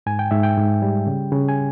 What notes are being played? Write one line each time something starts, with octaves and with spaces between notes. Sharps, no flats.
G#2 G#5
G5
G#2 E5
G5
G#2
G3
C#3
C#3
G#5